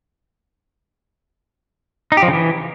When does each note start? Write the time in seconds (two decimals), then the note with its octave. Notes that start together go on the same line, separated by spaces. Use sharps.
2.12 D#4
2.17 G4
2.23 F3
2.28 C#3
2.33 E3